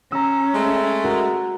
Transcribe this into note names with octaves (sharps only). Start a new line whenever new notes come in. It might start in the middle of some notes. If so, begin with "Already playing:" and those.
C#4 A#5 E6
G#3 A3
F#4 A#4